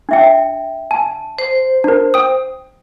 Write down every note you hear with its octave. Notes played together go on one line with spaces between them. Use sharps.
D4 E5 G5
G#5 A5
C5
D4 A#4
G5 D#6